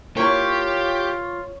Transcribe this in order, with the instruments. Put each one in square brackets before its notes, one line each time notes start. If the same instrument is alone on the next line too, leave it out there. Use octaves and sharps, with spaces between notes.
[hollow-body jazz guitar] A#3 E4 [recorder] F4 [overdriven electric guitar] G4 [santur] C#5 C#6